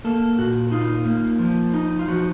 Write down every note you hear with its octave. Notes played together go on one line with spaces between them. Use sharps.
A#3 A4
A#2 F#4
D#4 F4
A#3
F3
D#4
F4
F3 F#4